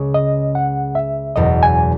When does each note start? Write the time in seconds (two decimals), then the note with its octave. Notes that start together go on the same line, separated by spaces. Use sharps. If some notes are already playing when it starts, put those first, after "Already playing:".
Already playing: C#2 C#3 G#3 C#4
0.14 D#5
0.55 F#5
0.95 E5
1.36 F#1 E2 B2 D#5
1.63 G#5